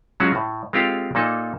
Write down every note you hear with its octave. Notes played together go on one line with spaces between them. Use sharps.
F#3 G#3 C#4 F4 F#4
A2
G#3 C4 F4 G4 A4 F5
A#2 A#3 D#4 A4